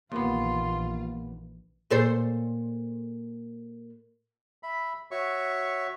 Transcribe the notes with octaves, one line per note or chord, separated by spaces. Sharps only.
A#1 D#2 E3 B3 F4 C6
A#2 A4 C5
E5 B5
F#4 C#5 E5 C#6